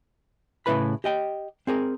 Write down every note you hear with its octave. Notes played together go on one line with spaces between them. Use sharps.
A2 C#3 F#3 E4 B4 B5
G4 D#5 G5
C4 G#4 A#4